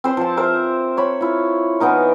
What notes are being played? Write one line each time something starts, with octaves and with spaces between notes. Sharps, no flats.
C4 C5 B5 C6
F3 A5
A#4 C5 E5
C#5 B5
E4 F4
E3 B3 D#4 A#4